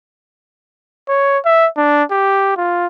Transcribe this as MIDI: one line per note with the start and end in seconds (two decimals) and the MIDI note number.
1.09 1.38 73
1.46 1.67 76
1.77 2.03 62
2.12 2.55 67
2.57 2.87 65